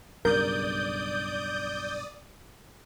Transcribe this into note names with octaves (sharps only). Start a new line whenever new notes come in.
B1 G2 C#3 A#4 D5 D#6 G6